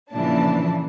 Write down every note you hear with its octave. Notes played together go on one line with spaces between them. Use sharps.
A#2 C#3 E3 F3 D4 A5